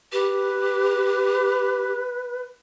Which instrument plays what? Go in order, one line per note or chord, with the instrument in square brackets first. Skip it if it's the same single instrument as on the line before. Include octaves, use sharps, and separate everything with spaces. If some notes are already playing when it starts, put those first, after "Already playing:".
[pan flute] G4 [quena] B4